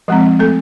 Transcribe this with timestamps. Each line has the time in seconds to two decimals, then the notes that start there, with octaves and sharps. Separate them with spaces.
0.08 F3 G#3 C4
0.39 A3 A4